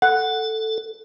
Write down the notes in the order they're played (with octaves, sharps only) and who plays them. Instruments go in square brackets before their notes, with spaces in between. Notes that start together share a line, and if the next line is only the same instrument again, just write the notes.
[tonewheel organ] A4 [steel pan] F#5